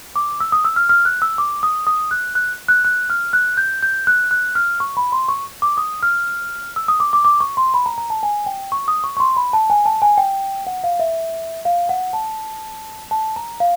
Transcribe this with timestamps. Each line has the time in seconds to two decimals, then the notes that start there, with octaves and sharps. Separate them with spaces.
0.16 D6
0.40 E6
0.52 D#6
0.65 E6
0.76 F6
0.89 F6
1.05 F#6
1.22 E6
1.38 D6
1.63 D#6
1.87 D#6
2.11 F#6
2.35 F#6
2.69 F#6
2.85 F#6
3.10 F6
3.33 F#6
3.57 G6
3.83 G6
4.07 F#6
4.31 F#6
4.55 F6
4.80 C#6
4.97 B5
5.12 C6
5.28 C#6
5.62 D6
5.77 D#6
6.03 F6
6.76 E6
6.88 D#6
7.00 D6
7.13 D6
7.25 D6
7.40 C#6
7.57 C6
7.74 B5
7.86 A#5
7.98 A#5
8.10 A5
8.23 G#5
8.46 G5
8.72 C#6
8.88 D#6
9.04 C#6
9.17 C#6
9.20 C6
9.37 B5
9.53 A5
9.70 G#5
9.86 A5
10.02 G#5
10.18 G5
10.67 F#5
10.84 F5
11.00 E5
11.65 F5
11.89 F#5
12.13 A5
13.11 A5
13.36 A#5
13.60 F5